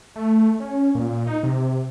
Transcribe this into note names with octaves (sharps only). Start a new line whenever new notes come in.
A3
C#4
A#2
D#4
C3